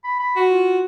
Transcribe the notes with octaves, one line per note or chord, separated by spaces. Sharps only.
B5
B5
F#4
F4